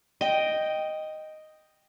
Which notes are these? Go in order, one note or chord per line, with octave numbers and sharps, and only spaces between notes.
D#5 G5